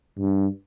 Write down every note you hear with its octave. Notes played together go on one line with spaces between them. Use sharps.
G2